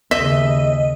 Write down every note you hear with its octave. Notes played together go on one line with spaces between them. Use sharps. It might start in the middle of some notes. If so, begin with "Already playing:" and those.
D#2 C#3 D#5 E5